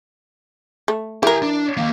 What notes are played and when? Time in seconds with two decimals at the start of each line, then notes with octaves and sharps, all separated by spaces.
0.88 A3
1.23 E3 G4 A#4 G#5
1.42 D4
1.77 D#3 A#3